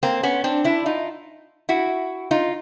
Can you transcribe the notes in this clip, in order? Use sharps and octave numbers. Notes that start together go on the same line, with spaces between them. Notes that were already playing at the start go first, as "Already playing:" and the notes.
A#3 C4
B3 C#4
C4 D4
D4 E4
D#4 F4
E4 F#4
D#4 F4